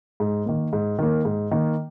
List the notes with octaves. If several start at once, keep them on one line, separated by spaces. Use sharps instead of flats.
G#2
D#3 A#3
G#2
D#3 A#3
G#2
D#3 A#3